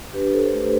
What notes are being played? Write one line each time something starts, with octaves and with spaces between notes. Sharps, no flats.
D4 G4 B4
A4 C5
C5
A3 G4 B4